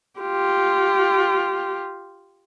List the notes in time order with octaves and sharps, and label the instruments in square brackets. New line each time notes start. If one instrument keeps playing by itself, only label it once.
[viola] F4 G4